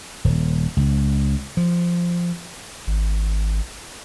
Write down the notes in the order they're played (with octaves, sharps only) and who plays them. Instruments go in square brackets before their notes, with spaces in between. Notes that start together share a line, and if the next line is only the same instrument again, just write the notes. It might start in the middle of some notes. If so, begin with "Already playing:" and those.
[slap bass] D#1
C#2
F3
[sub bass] G#1